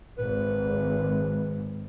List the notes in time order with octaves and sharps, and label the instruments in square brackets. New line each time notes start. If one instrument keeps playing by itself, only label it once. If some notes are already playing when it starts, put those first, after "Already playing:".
[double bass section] G#1 [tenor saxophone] B4